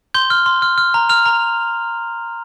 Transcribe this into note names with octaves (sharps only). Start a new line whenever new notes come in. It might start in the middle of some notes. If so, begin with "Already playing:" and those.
C6 G6 G7
F6
C6
F6
F6
A#5
F6 F7
A#5